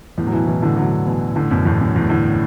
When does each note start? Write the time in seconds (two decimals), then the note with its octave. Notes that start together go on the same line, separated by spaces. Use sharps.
0.18 E2 A2
0.27 F#3
0.32 B2 E3
0.47 B2 E3
0.62 A2 D3
0.77 D3 F#3
1.06 B2 E3
1.36 A2 D3
1.51 F#2 B2
1.65 E2 A2
1.81 F#2
1.96 E2 A2
2.10 A2 D3